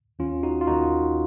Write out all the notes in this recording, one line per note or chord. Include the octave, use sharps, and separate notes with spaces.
D#2 D#3 C#4 F4
D#4 F#4
F4
D#2 D#3 D#4 F#4